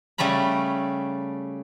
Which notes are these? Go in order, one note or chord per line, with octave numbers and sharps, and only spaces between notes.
C#3 G3 A3 A#5 B5